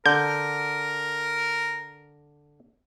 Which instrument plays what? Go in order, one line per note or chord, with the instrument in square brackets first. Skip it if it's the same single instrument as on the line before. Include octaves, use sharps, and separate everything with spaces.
[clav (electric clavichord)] D3 [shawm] A#4 [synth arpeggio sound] G6